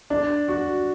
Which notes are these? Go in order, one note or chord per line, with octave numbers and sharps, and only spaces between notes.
D4
F#4